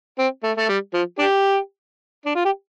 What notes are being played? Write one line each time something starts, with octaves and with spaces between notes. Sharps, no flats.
C4
A3
A3
G3
F3
D4 G4
D4
F4
G4